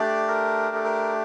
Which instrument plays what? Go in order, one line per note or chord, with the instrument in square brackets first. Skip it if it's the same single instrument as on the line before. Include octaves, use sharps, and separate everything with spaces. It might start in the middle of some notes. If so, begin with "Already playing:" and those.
Already playing: [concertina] A3 D4 G4 D5
A#4
A4
A#4